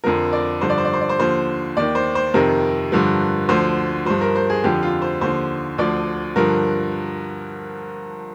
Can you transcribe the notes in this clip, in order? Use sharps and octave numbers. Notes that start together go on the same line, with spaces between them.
F2 D3 F3 A#4
D5
G2 D3 F3 C5
D5
C5
D5
C5
D5
C5
D#2 D3 F3 C5
D#2 D#3 D5
C5
C5
F2 C3 D#3 A#4
G2 D3 F3
D2 D3 F3 C5
G2 F3 C5
A#4
C5
G#4
F2 D3 F3 G4
F4
C5
D#2 D3 F3 C5
D2 D3 F3 D5
G2 D3 F3 A#4